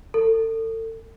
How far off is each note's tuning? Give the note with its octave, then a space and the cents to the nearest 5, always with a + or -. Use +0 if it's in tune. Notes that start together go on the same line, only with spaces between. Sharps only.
A4 +35